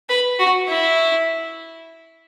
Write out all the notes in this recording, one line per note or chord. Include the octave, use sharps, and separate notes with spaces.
B4
F#4
E4